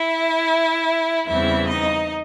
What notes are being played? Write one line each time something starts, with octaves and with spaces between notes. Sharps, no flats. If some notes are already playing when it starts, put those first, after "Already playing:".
Already playing: E4 E5
E2 C#3 E3 G3 C4 E4 E5
D#4 D#5